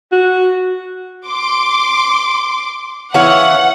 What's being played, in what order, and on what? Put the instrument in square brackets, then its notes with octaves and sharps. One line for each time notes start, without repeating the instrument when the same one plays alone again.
[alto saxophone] F#4
[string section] C6 D6
[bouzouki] E3 C#4 F5 [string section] F#5